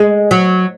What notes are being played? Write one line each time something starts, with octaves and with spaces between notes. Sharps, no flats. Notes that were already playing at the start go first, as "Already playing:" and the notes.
Already playing: G#3
F#3